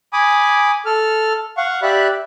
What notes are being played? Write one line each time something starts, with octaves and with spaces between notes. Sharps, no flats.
G#5 B5 D6 D#6
A4 F6
F5 F#5 C#6
G4 D5 E5 B5 F#6